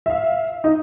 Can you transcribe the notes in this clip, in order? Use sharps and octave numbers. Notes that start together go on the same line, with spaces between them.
E5 F5
D#4